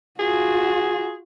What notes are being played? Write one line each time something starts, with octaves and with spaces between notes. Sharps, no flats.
F4 F#4 G#4